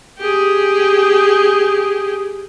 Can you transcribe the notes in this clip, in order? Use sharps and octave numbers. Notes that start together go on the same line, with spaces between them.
G4 G#4